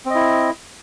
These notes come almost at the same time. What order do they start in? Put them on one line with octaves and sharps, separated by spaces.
C4 D#5 E4